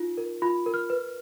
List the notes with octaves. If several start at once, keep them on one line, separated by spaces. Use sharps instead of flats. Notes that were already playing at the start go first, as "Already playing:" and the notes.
Already playing: D#4 F4
A#4
F4 B5
A#4
F6
B4